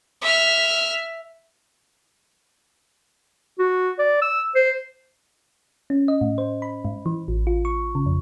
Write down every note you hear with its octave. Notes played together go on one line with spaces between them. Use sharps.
E5 F6
F#4
D5
E6
C5
C#4
D#5
A2
C5
B5
G#2
E3
A1
F4
C#6
C#3
F2